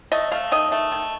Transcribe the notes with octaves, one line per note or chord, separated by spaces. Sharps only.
A3 D#5
A3 F5
D#3 D#5
A3
D#3